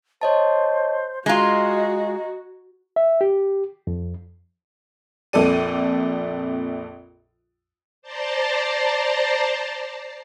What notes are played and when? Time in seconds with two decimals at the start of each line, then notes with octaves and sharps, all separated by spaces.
0.21 C5 C#5 D#5 A5
1.26 G#3 F4 F#4 D#5 A#5 G#6
2.96 E5
3.21 G4
3.87 F2
5.33 A#1 F2 A4 D5 D#7
8.02 C5 D5 A5 A#5 C6